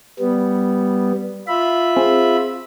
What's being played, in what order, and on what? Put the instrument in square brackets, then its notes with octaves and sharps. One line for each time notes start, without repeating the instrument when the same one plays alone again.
[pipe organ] G3 B3
F4 E5 B5
[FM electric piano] C4 G#4 C5